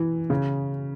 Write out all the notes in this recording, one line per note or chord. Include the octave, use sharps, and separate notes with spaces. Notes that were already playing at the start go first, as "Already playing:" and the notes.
Already playing: E3
C#3